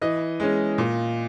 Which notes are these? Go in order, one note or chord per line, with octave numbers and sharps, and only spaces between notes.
E3 D#5
G#3 C#4
A#2